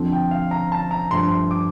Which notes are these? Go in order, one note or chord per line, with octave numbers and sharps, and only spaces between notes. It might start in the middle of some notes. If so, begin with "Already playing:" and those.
Already playing: F2 D3 F3 C4
G5
F5
A#5
A5
A#5
G2 F3 A3 C6
C6
D6